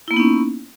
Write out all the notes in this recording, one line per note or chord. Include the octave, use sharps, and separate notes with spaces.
A#3 B3 C#4 D#4 E4